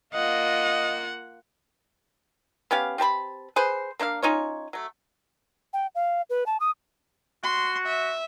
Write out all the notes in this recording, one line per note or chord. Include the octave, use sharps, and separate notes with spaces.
A#3 F4 D#5 F#5
B3 C#4 G4 F5
C4 G4 A5 B5
G#4 B4 C5
A#3 D4 C5 F5
C#4 D#4 F4 C#5
F#3 A3
G5
F5
B4
A5
D#6
F#4 C6
E5